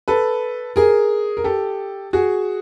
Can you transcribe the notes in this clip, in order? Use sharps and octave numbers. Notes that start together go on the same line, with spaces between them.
A4 B4
G#4 A#4
A#4
G4 A4
F#4 G#4